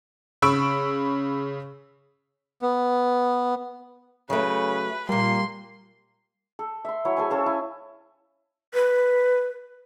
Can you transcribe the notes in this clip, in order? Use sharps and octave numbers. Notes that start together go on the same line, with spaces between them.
C#3 B5 C#6 E6 D7
B3
C#3 F#3 A3 B4
A#2 F3 G3 A#3 C6
A4
E5 C6
F#3 E4 C#5
G#4 A4 C5 G#5
C#4 A4 F5
E4 G#5
B4